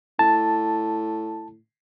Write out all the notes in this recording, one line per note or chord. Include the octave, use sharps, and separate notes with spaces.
A2 A5